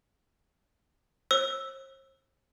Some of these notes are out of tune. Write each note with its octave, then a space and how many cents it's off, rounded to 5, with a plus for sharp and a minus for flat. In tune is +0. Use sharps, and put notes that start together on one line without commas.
C5 +45 E6 +0